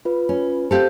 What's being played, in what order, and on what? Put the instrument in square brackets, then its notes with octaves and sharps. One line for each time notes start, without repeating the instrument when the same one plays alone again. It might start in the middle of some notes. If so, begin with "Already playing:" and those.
[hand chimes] F4 B4
[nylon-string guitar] C#4
[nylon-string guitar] C4 G4 A4 [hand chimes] C5 F5 G6